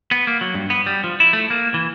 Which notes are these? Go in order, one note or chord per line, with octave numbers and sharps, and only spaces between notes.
B3
A#3
F#3
G2
B3
G3
F3
E4
A3
A#3
E3